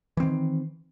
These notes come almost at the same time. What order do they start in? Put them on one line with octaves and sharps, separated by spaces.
E3 C4 D#3